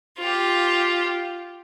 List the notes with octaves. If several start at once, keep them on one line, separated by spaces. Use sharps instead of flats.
F4 G4